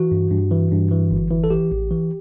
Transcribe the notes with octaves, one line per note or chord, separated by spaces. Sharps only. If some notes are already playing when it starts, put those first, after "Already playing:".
Already playing: E3 F#4
G2
G2
E3
G2
E3
G1
E3
A4
E3 G4
A1
E3